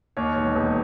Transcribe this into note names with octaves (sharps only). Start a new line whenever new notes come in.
D#2 C#5
E1
E1